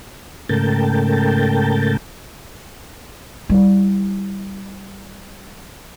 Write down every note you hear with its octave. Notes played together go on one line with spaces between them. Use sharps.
G#2 C#3 A3 A#4 G5 A5
G3 E4